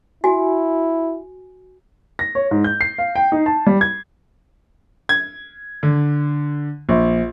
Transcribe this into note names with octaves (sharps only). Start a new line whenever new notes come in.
E4 F#4 G#5
A#6
C#5
G#2
G6
C7
F5
G5
D#4
A5
G3
G#6
G#6
D3
A#1